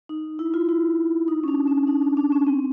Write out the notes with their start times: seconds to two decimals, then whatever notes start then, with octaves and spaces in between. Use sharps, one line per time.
0.09 D#4
0.39 E4
0.54 F4
0.69 E4
1.28 D#4
1.44 C#4
1.48 D4
1.68 C#4
1.87 D#4
2.02 D4
2.17 D4
2.32 C#4
2.47 C4